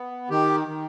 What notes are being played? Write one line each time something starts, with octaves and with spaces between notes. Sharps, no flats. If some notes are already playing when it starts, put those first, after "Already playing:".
Already playing: B3
D#3 G4
D#3